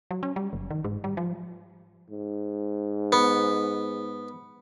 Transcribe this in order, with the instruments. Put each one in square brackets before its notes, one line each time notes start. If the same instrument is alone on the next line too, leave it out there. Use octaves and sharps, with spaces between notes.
[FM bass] F#3
C#4
G3
F#1
D#3
G#2
G3
F3
[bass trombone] G#2
[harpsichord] B3